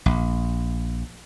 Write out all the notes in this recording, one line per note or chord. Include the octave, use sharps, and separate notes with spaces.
A#1